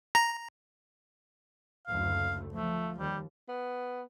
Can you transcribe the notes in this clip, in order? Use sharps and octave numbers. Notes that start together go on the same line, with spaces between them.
A#5
F#1 D2 A3 F5
F3 A3
D#2 G3
B3